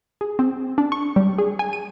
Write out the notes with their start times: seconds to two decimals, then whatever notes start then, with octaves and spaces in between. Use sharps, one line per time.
0.21 G#4
0.39 C4
0.78 D4
0.92 C#6
1.16 G3
1.38 G#4
1.59 G#5
1.73 D#7